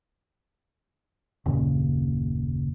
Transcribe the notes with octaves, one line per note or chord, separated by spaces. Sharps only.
F#1 D#2 A#2 C#3